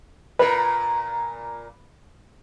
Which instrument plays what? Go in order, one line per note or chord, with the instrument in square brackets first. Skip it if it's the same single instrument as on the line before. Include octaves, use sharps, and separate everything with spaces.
[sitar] A#2 A#4 [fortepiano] B4